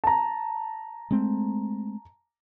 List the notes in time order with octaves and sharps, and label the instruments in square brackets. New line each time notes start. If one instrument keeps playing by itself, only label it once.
[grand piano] A5 A#5
[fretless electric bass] G#3 A3 C4